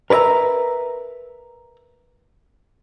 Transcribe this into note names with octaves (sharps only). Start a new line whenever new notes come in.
A#4 B4 D5 E5 A#5